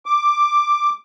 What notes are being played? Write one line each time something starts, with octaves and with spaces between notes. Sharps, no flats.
D6